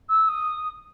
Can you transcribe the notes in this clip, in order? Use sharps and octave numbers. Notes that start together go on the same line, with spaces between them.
E6
D#6